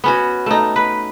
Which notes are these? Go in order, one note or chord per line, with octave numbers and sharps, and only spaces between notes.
B3 C#4 F#4
A3 D#4
B4